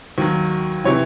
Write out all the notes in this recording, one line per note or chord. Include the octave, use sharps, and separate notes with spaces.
D#2 D#3 F#3
C3 E3 C#5